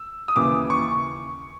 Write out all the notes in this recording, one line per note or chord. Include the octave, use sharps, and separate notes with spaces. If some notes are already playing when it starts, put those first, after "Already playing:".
Already playing: E6
D#6
D#2 C#3 E3 D6
C#6